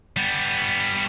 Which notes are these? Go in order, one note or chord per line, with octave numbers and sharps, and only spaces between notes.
G3 B3